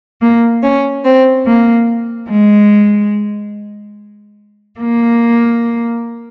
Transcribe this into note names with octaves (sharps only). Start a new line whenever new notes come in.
A#3
C#4
C4
A#3
G#3
A#3